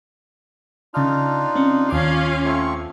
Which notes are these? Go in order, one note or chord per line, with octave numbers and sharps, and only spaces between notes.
C#3 D4 D#4 F4 F6
C4 C#4
D#2 C#4 F4 F5 D6
A3 C4 C#6